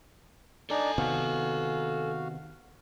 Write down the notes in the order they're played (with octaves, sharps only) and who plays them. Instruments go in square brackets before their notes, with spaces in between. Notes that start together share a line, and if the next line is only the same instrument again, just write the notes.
[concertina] D4 D#4 D5 [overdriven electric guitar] A4 G#5
[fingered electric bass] C3 D#3 B3 [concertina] F#4 F5